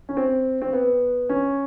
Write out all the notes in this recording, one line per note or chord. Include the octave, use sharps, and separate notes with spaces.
C#4
C4
C4
B3
C#4